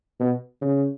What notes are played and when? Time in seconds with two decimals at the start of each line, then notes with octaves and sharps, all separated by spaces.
0.20 B2
0.61 C#3